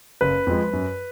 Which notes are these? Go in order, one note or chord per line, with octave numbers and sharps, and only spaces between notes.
F#1 B4
F2 F3 G#3
F#2